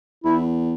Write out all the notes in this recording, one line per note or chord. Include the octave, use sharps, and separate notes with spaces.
E2 E4